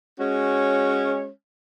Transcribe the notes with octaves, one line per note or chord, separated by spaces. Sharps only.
G#3 C#4 F#4 C#5